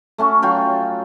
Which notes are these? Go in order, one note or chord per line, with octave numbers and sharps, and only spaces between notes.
A3 C#4 F#4
F#3 F4 G5